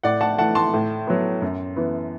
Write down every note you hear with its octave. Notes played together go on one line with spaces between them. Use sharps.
A2 D5 F#5
F#5 A5
E3 A3 F#5 A5
A5 C6
A2
F#3 B3
F#2
E3 B3